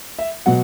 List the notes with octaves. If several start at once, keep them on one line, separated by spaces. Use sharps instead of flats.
E5
B2 F#3 F#5